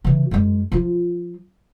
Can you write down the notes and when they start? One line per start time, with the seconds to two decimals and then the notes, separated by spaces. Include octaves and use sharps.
0.04 C#3 E3
0.31 F#2 G#3
0.72 F3 F4